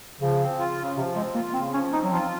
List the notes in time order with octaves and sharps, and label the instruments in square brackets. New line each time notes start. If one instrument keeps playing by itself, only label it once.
[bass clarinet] C#3 [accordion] F3
[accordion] C4
F4
C#3
[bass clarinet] C3 [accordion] F3
[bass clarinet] G#3 [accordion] C4
[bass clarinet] A#3 [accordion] F4
[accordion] C#3 [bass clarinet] C4
[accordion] F3 [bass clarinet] C#4
[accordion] C4 [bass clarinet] D#4
[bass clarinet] F#3
[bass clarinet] F3 [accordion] F4